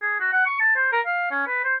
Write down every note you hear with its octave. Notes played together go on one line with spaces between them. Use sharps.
G#4
F#4
F#5
C#6
A5
C5
A#4
F5
C#4
B4
C5